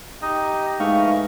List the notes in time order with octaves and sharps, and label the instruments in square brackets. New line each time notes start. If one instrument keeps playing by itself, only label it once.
[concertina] D#4 D#5 [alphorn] G4
[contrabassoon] G#2 [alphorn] E3 [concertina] A3 D#5 C#6 [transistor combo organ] F5